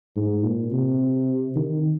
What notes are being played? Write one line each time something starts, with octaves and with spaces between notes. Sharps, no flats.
G#2
A#2
C3
D#3